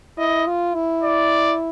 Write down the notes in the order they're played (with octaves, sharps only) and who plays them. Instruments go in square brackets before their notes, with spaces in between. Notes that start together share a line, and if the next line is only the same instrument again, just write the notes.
[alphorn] E4 [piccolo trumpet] D#5
[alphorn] F4
E4
[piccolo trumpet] D5